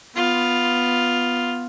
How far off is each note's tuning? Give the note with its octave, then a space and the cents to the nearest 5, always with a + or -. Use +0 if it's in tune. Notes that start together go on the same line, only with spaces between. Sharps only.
B3 +0 F4 +5